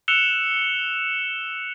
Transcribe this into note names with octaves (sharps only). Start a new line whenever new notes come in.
E6 F#6 C#7 E7 F7 G7